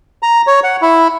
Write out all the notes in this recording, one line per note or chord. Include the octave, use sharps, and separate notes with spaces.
A#5
C#5
F#5
E4